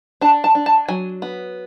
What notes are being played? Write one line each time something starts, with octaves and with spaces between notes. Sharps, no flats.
D4 A5
A5
D4
A5
F#3 G#5
B3